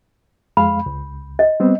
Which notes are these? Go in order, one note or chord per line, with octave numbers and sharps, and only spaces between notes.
F2 G#3 F5 B5
C#2
D#5
G3 B3 C4